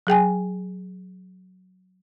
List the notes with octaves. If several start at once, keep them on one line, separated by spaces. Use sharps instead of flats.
F#3 G#4 G5 G#5